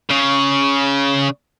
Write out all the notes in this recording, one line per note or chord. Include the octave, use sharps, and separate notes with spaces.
C#3